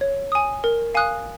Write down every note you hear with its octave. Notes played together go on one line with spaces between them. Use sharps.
C#5
G#5 D#6
A#4
F5 G#5 D#6 F#6